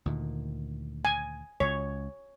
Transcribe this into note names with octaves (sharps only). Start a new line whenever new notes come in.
D2 A#2 D#3
G#5
C#2 C#5